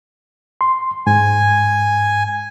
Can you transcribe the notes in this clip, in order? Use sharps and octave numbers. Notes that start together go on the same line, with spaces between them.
C6
G#2 G#5